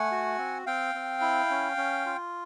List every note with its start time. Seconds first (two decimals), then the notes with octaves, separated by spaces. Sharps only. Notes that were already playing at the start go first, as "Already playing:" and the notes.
Already playing: A3 F#5 G#5
0.11 F#4
0.38 C4
0.66 C4 F5 G5
0.95 C4
1.22 E4
1.51 C#4
1.77 C#4
2.06 F4